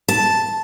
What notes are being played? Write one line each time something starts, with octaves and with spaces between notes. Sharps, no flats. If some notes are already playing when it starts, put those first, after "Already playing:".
A5